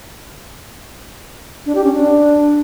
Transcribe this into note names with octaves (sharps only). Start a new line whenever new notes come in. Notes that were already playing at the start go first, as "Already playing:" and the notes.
D4
G4
C#4
D4